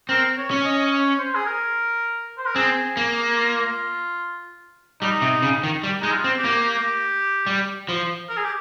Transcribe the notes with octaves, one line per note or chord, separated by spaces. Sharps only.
C4 A#4
C#5
C#4
D#5
C#5
C5
G#4
A#4
C5
A#4
C4 G#4
A#3
F4
G3 D#4
C3
C#3
D#3
G3
G#3 D#4
F4
C4
G4
A#3
G4
G3
F3
A#4
G#4
G4